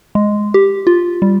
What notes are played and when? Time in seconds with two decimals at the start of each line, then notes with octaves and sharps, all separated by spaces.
0.15 G#3
0.54 G4
0.87 F4
1.22 G3